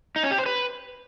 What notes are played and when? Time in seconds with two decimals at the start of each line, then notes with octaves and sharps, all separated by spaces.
0.16 D#4
0.23 C#4
0.31 G4
0.39 C5
0.46 B4